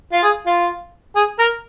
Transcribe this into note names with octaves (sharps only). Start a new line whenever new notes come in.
F4
G#4
F4
G#4
A#4